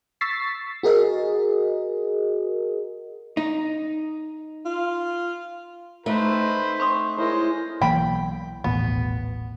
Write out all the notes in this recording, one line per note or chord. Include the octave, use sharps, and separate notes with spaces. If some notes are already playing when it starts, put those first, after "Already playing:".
C#6 E6 A6 B6 C7
F#4 G#4 A#4 D#5
D#4
F4
A3 D#4 B4 C5 D5 D#5
C4
C4 C6 C#6 D#6
G#3 E4 A#4 C5 C#5
B1 E3 A#3 G5 B5
D#1 A1 B2 B3